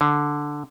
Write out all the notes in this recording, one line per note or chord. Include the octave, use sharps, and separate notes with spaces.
D3